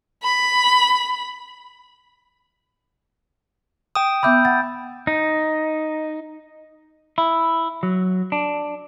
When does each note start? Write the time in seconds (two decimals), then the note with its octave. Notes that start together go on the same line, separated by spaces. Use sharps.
0.23 B5
3.95 G5 D#6 E7
4.23 B3 E5 B5 D6 E6 G6
4.45 F#5 A6
5.07 D#4
7.18 E4
7.83 F#3
8.32 D4